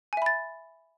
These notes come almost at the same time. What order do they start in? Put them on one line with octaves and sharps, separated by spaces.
G#5 E5 B5 A6